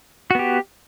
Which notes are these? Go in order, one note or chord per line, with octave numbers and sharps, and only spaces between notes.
B3 F#4 G4